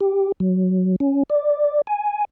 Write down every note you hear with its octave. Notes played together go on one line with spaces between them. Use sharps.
G4
F#3
C#4
D5
G#5